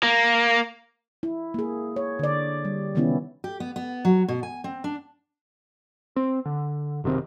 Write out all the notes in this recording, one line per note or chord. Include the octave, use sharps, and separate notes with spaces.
A#3
E4
A#3 G#4
C#5
D3 D5
G3
C3 D#3 E3 B3 C#4 E4
G4
B3
B3
F#3
B2
G#5
C4
D4
C4
D3
F#1 C3 D#3 C4